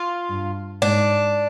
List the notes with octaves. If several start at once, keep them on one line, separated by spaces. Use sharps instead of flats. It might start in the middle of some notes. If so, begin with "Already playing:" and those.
Already playing: F4
G2
G#2 D4